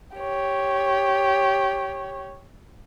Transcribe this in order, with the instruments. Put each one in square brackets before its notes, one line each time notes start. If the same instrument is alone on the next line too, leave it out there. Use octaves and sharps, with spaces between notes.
[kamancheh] G4 C#5